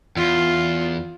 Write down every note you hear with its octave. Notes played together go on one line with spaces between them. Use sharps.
E2 F4